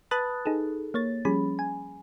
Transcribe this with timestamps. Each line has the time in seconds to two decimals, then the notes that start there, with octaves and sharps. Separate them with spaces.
0.11 B4 A5 B5 D#6 F#6 A6
0.46 D#4 G#4 A4
0.94 A#3 C#5 A6
1.25 F3 G3 C#4 G#4 B5
1.59 G#5